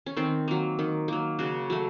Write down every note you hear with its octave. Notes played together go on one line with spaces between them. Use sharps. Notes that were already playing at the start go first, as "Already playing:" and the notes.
C#4
D#3 C4
F#3 A#3
D#3
F#3 A#3
C#3 F#4
F#3 A3